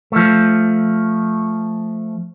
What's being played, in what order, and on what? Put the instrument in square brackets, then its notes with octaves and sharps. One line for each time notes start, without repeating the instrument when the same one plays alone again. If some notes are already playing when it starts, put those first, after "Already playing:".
[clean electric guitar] F3 A3